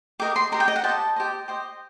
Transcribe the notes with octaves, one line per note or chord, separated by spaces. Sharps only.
G4 A#4 D#5 D6
C6
G4 A#4 D#5 A#5
G5
D#5
F#5
G4 C5 D#5 A5
G4 C5 D#5
G4 C5 D#5